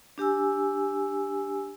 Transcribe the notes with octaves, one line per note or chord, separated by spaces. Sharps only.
D4 G4 G#5 E6